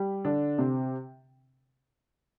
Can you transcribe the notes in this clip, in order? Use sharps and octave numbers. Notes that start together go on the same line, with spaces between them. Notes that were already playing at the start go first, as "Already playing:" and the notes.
Already playing: G3 G4
D3 D4
C3 C4